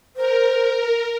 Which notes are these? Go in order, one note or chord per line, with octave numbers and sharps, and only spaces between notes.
A#4 C5